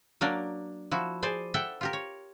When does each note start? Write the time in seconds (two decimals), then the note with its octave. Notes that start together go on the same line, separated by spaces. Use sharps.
0.21 F#3 A#3 D4 A#4 D5
0.91 F3 E4 F#4
1.23 G#4 C5 D5 G#5
1.54 A4 E5 F#5 G5
1.81 F4 G4 A#4
1.93 C#5